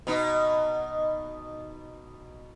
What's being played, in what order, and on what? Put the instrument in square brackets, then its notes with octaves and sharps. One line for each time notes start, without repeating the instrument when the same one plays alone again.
[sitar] B2 D#4